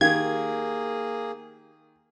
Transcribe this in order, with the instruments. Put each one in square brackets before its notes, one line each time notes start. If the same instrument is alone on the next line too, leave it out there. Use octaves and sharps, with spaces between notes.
[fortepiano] D#3 [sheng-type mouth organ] A#3 G#4 [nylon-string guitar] G4 F5 [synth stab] G#6